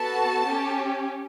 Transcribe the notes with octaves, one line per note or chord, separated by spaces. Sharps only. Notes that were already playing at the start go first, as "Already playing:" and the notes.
Already playing: B3 F#4 A4 A5
C#4 G4